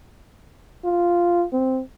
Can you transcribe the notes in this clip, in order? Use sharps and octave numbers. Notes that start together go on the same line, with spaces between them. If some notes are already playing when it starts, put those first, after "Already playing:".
F4
C4